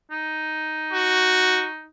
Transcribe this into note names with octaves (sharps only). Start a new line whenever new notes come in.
D#4
F#4